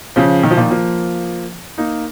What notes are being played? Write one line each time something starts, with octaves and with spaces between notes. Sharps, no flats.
C#3 F3
D#3
F3
A#2 D#3
F3 A#3
A#3 D#4